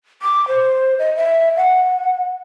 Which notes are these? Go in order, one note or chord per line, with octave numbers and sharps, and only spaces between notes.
D6
C5
D#5
E5
F#5